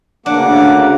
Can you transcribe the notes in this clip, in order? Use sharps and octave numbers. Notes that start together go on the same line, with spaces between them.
D2 C#3 A#3 D4 F#5 D6